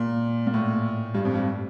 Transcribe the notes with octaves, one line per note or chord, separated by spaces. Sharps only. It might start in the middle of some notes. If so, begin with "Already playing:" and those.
Already playing: A#2
A#2
A2
G2
F2
G2